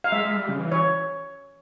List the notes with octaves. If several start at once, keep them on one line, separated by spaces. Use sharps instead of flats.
F5
G#3 E5
G#3
G3
C#3
E3
C#5